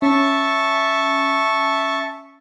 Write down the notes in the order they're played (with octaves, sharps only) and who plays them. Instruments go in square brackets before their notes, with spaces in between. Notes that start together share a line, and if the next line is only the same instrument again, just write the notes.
[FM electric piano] C#4 [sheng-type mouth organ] E5 A5 C#6